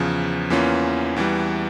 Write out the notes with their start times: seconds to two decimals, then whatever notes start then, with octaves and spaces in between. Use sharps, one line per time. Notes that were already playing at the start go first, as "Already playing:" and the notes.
Already playing: E2 C#3 F3
0.50 E2 E3 A#3 C#4 F4
1.16 E2 E3 G3